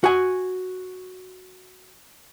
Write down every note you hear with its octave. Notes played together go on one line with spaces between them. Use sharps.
F#4 G#5